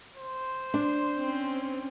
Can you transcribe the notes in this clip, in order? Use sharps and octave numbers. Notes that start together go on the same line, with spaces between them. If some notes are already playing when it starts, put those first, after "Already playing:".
C5
D4
C4 C#4